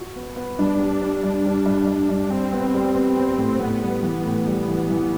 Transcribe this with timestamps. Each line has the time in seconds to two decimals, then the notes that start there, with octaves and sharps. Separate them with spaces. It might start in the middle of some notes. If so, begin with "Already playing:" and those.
Already playing: F#4
0.16 B3
0.36 B3
0.59 G2 D4
0.79 G3
1.01 G3
1.23 G2
1.45 G3
1.66 G2
1.87 G2
2.09 G2
2.30 G3 C4
2.53 B3
2.74 G3
2.95 B3
3.17 B3
3.38 A2
3.60 A2 B3
3.82 G3
4.03 E3 B3
4.25 A2
4.47 G3
4.68 E3
4.90 E3